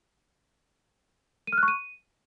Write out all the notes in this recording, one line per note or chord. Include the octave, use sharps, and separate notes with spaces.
D#7
F6
F#6
C#6
D#7